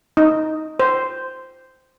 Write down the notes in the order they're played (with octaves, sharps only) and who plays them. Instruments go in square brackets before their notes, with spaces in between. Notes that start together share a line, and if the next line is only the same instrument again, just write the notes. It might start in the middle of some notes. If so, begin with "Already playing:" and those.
[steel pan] D#4
C5